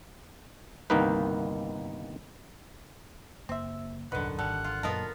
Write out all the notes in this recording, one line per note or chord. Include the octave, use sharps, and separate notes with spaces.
G1 C2 D#3 A#3 D#4 B4
F#1 A#3 C4 E5
D#1 C2 F#2 D3 D#3 B4 F#5
G#1 G3 A4 F#5
F4
F#2 A#2 F#3 B3 F4 A#4 D#5 A5